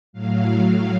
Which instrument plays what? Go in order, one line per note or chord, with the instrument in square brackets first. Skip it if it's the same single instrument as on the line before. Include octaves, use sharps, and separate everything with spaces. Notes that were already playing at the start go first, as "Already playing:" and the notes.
[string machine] A2 F#3 F5